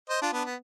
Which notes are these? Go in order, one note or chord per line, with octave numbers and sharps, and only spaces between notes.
C5 D#5
D4 F4
B3 D4
B3